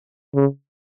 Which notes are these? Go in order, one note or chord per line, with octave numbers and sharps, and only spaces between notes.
C#3